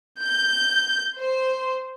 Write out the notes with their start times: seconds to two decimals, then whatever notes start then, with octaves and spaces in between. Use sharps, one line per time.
0.21 G6
1.17 C5